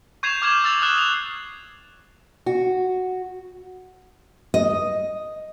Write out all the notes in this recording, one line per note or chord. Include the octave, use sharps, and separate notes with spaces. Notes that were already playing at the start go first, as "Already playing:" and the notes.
C#6 G6 G#6 C7 E7 F7
D6 F6 G6 G#6 E7 F#7
E6 G6 A6 F7 F#7
D#6 F6 F#6 E7
F7
F#4
D#5